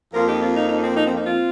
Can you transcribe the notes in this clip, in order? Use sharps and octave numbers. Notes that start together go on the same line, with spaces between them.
F2 F3 A#3 F4 A#4
D#4 G4
C4 F4
D#4
D#4
D#4
C4
D#4
C4
D#4
C4 F4